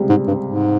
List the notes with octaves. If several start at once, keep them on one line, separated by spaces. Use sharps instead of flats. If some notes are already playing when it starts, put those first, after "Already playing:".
Already playing: C#2 C3 G3
G#2
G2
G#2